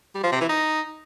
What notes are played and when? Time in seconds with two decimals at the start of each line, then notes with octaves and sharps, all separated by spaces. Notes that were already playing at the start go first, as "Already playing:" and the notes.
0.15 G3
0.23 F3
0.32 C3
0.41 E3
0.49 D#4